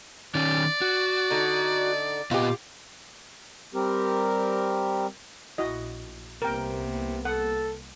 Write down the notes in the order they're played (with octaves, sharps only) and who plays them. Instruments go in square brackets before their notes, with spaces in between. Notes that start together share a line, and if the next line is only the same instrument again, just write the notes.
[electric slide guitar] D#3 C#4 [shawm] D5
[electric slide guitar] F#4
[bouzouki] D3 D#4
[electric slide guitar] A#2 B3 D#5 [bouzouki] F4 G4
[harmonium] G3 C4 G4 A#4
[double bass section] A#1 [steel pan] E4 F#4 D#5
[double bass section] C2 A#3 B3 [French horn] C3 [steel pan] A#4 G5
[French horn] A4 [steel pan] F#5